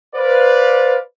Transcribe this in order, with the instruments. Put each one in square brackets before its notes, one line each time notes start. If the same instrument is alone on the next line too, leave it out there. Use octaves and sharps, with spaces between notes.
[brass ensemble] B4 C5 D5 F5